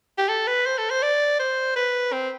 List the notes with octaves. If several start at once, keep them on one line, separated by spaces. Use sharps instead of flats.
G4
A4
B4
C5
A4
C5
D5
C5
B4
C4